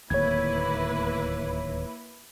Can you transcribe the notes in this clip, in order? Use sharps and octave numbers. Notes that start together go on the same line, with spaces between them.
D1 D#2 A#3 E4 B4 C#5 G#6